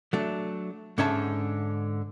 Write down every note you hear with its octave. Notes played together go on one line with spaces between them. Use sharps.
F#3 A3 D4
G#2 D3 C#4 E5 A5